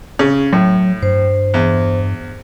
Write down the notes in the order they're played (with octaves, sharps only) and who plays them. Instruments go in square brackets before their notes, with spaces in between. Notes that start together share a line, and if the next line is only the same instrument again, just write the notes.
[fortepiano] C#3
[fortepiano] A2 [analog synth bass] F#3
[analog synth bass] G2 [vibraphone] C5
[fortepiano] E2